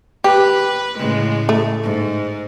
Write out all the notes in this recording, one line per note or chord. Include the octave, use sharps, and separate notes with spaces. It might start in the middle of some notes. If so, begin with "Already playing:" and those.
G4 B4
A2 C#3 G#3
A3
G#2